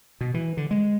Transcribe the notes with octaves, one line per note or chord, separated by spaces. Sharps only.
B2
E3
D3
G#3